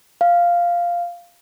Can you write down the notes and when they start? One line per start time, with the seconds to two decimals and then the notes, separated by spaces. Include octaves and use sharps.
0.21 F5